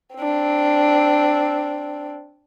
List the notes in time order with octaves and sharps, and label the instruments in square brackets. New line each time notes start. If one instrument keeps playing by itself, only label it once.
[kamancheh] C4 D4